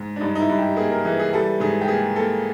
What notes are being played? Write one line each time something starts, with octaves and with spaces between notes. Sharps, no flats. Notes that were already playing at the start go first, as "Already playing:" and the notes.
Already playing: G#2
D4
G2 D#4
D#4
E4
G2
G4
A#3 G#4
A#4
E3 G#4
G#4
G3 A4
G#2 G#4
G4
A#3 G#4
A#3 A4